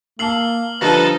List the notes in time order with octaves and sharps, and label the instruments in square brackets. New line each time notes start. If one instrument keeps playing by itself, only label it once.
[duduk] A#3 [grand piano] A5 E6 [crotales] F6 C7 F#7
[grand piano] D3 F3 G3 [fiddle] D#4 A4 [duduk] B4 [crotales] A#6